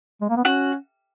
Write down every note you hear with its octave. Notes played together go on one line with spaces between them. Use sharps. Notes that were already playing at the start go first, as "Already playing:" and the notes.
G#3
A#3
B3
C#4 F#4